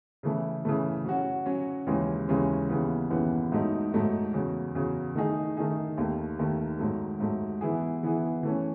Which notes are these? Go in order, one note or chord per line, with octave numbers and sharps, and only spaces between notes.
C#3 E3 A3 E4
C#3 E3 A3 E4
F#3 C#4 F#4
F#3 C#4 F#4
D#2 C#3 E3 G#3 C#4
D#2 C#3 E3 G#3 C#4
D#2 C#3 E3 B3
D#2 C#3 E3 B3
G#2 F#3 A3 D#4
G#2 F#3 A3 D#4
E2 C#3 F#3
E2 C#3 F#3
D#3 A3 D#4 G#4
D#3 A3 D#4 G#4
D#2 D#3 A3
D#2 D#3 A3
G#2 F#3 A3
G#2 F#3 A3
E3 B3 E4 G#4
E3 B3 E4 G#4
E3 A3 C#4